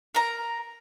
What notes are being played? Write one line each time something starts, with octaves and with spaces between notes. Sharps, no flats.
A#4 A#5